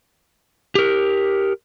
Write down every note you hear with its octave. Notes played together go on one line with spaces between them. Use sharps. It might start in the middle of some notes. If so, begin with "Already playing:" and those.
G4 A#4